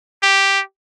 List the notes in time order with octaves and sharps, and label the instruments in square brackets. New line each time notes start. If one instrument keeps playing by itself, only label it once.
[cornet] G4